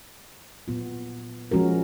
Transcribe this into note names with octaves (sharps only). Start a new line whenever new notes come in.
A#2 F#3 B3 F4
F3 G#3 C#4 F#4 A#4